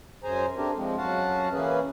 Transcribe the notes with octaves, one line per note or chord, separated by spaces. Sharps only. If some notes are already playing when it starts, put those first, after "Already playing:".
F#2 G#4 C5 G#5 A#5
A3 C4 D4 G4 A#4
F3 G#3 C4
F#2 F#4 F5 F#5 A5
E3 A#3 C#4 G#4 B4